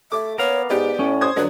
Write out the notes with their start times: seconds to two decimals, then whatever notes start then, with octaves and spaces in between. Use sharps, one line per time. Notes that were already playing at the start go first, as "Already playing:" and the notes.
0.12 A3 E5 D6
0.38 B3 A#4 C#5 F5
0.70 G#2 B3 G4 D5
0.99 A2 C#4
1.21 C5 D#6 G#6
1.36 F2 D3 F#3 D4 B4